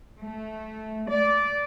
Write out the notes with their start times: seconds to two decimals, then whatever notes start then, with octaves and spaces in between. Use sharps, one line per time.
0.20 A3
1.08 D5